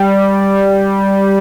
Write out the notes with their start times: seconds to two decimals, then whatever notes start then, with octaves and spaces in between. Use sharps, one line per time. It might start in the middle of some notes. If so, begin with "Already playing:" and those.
Already playing: G3